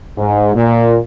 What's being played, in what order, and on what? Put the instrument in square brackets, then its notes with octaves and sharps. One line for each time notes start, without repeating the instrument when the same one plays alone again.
[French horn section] G#2
A#2